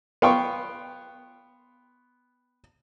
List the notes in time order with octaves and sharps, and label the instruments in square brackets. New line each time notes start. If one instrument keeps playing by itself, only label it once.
[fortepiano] B3 F5 G5 C6 C#6